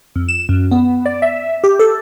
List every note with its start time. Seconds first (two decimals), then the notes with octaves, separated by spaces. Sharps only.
0.16 F2
0.28 E7
0.49 F#2
0.71 B3
1.06 D5
1.22 E5
1.64 G4
1.79 A4